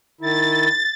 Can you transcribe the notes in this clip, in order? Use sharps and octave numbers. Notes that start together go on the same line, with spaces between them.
D#3 E4 A6